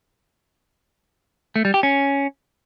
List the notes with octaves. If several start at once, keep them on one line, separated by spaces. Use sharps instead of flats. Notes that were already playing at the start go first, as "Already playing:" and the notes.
A3
G3
G4
C#4